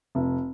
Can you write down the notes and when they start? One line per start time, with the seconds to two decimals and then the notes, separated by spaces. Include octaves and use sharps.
0.15 F1